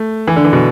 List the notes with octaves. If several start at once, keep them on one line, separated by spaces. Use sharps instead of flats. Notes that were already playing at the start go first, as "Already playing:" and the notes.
Already playing: A3
E3
D3
E3
B2